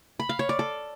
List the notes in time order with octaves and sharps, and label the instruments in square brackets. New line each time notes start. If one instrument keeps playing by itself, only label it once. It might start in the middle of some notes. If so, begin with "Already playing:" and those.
[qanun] B5
F5
C#5
D5
A4